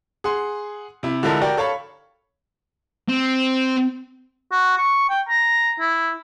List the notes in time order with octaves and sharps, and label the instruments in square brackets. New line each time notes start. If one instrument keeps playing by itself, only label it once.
[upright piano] G#4 F#5 C6
C3 E4
D3 F3 G#3 E4 A4 A#4
F#4 G4 A#4 D5 G5
A4 C#5 F5 A5 B5
[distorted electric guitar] C4
[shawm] F#4
C#6
G5
A#5
E4